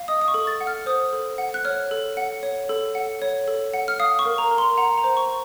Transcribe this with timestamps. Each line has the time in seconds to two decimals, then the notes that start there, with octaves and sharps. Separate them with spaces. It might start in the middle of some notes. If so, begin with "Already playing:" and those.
Already playing: F5
0.08 D#5 D#6
0.21 D#6
0.28 C#6
0.34 A4
0.47 A6
0.60 F#5
0.67 F6
0.86 C5 D#6
1.13 A4
1.38 F#5
1.54 F#6
1.65 C#5 F6
1.91 A4
2.17 F#5
2.43 C#5
2.69 A4
2.95 F#5
3.22 C#5
3.48 A4
3.74 F#5
3.88 F6
4.00 F5 D#6
4.19 C#6
4.25 A#4
4.38 A#5
4.51 A#4
4.58 C6
4.77 F#5 A#5
4.98 A#5
5.04 C5
5.17 C#6